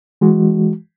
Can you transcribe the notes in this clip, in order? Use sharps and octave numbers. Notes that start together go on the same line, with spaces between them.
E3 G#3 F#4